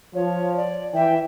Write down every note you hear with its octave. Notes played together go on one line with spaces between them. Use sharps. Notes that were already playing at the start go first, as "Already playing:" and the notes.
F3 C#5
D5
E3 E5 G5